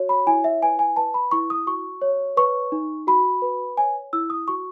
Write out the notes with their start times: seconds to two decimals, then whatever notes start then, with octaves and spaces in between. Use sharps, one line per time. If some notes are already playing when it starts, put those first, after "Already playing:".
Already playing: F#4 C#5
0.09 B5
0.27 E4 G#5
0.44 E5
0.63 B4 G#5
0.79 G#5
0.96 B4 A5
1.14 B5
1.31 E4 C#6
1.50 D#6
1.67 F#4 C#6
2.02 C#5
2.37 B4 C#6
2.72 D#4
3.07 F#4 B5
3.42 B4
3.77 C#5 G#5
4.13 E4 E6
4.30 D#6
4.48 F#4 C#6